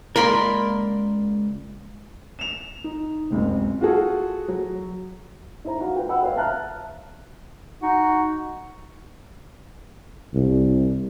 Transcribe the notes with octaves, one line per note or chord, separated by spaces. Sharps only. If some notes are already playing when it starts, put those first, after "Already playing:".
C#2 A#3 A#4 D5 B5 C6
E7 F7
D#4
F#1 C#2 C3
F4 F#4 G#4 A4
F#3
D#4 E4 C5 A#5
F#4 F5 F#5
F4 B4 G5
D#5 F#5 G5 B5 E6
B4 C#5 F5
E5 F5 A5 A#5 F6 F#6
D#4 F#4
C2